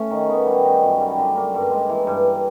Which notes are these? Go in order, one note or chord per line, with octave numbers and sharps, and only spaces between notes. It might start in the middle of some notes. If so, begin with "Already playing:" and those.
Already playing: A3 C#4
D#3
B3
G3
D#4
F#2
G3
D3
A#3
G2
G#3
E3
G2